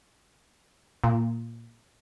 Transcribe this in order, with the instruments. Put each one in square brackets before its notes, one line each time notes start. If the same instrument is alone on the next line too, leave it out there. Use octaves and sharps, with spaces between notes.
[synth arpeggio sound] A#2